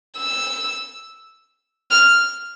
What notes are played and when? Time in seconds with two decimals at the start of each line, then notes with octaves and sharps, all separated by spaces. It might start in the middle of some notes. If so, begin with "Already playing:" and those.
0.18 E6
1.91 F6